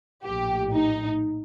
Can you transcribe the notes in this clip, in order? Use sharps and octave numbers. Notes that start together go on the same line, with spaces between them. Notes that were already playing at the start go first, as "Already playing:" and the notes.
A#1 A2 G4
D#4